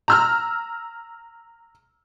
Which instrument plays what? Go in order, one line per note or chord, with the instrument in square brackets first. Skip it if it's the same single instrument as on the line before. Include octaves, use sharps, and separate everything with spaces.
[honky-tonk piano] A#5 E6 F6